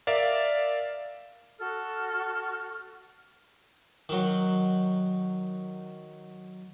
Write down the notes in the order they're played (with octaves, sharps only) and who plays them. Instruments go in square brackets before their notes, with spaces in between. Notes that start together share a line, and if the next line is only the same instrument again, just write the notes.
[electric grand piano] A#4 D5 E5 F5
[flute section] F#4 A4 F6
[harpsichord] D#3 F#3